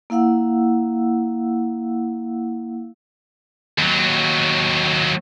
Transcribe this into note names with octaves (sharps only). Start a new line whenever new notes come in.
A#3 E4 F5 F#5 E6
D#2 F#3